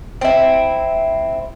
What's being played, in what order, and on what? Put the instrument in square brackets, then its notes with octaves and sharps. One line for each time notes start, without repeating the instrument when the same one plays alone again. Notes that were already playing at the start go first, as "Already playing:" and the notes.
[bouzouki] C4 E4